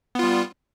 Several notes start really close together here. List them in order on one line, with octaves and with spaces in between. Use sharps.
B3 F4 G3